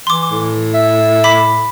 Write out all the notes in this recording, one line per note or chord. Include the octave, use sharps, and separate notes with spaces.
E3 C6 D6
A2
E5
B5 D6 B6